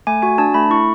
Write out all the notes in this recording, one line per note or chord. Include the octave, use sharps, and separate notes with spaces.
A3 G#5
F#4 G#5
D4 A5
A3 B5
E4 C#6